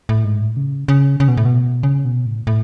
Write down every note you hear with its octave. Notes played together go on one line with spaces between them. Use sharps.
A2
G#2
A2
C#3
C#3
C#3
B2
A2
B2
C#3
B2
A2
A2